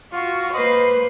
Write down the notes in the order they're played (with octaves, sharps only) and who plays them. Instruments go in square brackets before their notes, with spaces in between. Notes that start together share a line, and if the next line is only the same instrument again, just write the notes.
[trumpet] F4 [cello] F#4
[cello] A#3 C5 [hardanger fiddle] B4 [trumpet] D#5